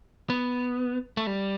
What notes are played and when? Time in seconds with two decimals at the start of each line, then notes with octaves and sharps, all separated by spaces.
0.30 B3
1.17 A3
1.27 G3